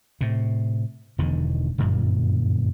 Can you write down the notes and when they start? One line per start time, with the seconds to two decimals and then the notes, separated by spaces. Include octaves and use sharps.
0.21 A2 C3
1.18 E1 E2 D3 D#3
1.78 G1 F#2 A#2 A#3